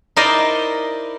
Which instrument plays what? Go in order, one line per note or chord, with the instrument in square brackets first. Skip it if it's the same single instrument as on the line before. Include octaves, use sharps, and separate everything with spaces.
[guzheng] D#4 E4 A#4 C5 D5 D#5